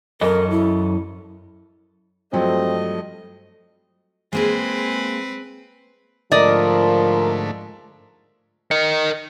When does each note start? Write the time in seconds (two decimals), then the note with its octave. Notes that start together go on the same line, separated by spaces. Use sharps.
0.21 F#2 A4 A#4 D#5
0.50 E4
2.33 G2 F3 F#3 A3 C4 D#5
4.33 G#3 A#3 C4 G#4 B4
6.32 G#2 D3 F3 A3 A#4 D5 D#5
8.71 A#4 D#5 C#7